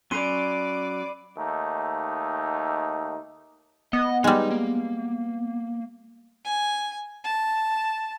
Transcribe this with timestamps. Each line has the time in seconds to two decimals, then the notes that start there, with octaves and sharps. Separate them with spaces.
0.11 F#3 C#4 D5 B5 C6 C7 D#7
1.37 D#2 A3 D#4
3.93 B3 D#5
4.24 G3 G#3 D#4
4.51 A#3
6.44 G#5
7.24 A5